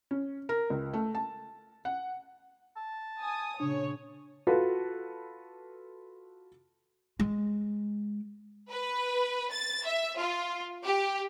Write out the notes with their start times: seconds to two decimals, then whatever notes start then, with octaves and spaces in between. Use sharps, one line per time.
0.11 C#4
0.49 A#4
0.70 C#2
0.94 A3
1.15 A5
1.85 F#5
2.76 A5
3.19 G#5 D#6
3.60 A#2 C#3 D4 C#5
4.47 F4 F#4 A4 B4
7.20 G#3
8.70 B4
9.52 A6
9.86 E5
10.18 F4
10.84 G4